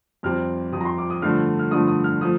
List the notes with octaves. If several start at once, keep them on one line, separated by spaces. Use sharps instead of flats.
F2 C3 G3 C4 F6
F2 C3 G3 C4 D#6
A#5
C6
D6
D#6
G2 D3 F3 A3 F6
F6
G2 D3 F3 A3 D#6
D#6
F6
F3 A3 D#6